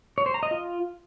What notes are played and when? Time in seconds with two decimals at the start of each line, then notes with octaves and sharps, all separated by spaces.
0.18 C#5
0.26 C5
0.34 A#5
0.43 D#5
0.51 F4